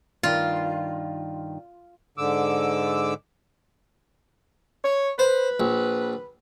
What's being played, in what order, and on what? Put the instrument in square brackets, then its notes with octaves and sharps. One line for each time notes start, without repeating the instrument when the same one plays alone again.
[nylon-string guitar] G2 D#3 [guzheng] F4
[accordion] G#2 D3 D6 E6
[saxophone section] C#5
[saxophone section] B4 [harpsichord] C5
[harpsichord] A#1